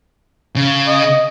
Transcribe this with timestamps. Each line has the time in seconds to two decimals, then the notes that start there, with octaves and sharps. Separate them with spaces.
0.56 C#3
0.87 D#5